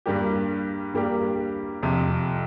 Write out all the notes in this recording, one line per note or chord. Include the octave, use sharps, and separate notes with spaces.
G2 G3 A#3 G4
G2 G3 A#3 G4
F2 C3 F3